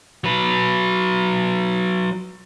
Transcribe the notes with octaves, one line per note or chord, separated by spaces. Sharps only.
F#3 B4